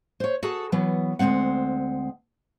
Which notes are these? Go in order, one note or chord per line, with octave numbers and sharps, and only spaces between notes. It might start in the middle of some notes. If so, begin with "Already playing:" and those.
C5 C#5
F#4 G#4 A4 A5
E3 F#3 B3
D2 F3 G#3 C4 F#5